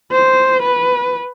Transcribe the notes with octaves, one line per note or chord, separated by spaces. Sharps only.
C5
B4